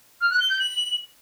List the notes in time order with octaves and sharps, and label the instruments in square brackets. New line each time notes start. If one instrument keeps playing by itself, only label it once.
[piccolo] F6
F#6
G7
G6
F#7